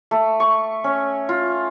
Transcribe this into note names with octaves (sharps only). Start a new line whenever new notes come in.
A3
C#6
C#4
F4